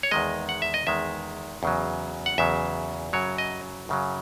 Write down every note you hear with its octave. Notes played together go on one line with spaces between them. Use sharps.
C#5
E2 D#3 G#3 D#5
F#5
E5
D#5
E2 D#3 G#3 E5
E2 C#3 F#3
F#5
E2 C#3 F#3 E5
F#2 C#3 F#3 C#5
D#5
F#2 C#3 F#3